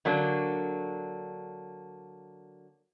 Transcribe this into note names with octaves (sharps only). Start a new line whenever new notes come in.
D3 F#3 A#3 D4